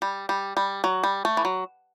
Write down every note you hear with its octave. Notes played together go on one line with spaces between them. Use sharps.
G3
G3
G3
F#3
G3
A3
E3
F#3